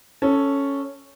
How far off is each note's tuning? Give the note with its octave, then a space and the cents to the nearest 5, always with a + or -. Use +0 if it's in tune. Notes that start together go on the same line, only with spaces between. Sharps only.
C#4 +0 A4 +0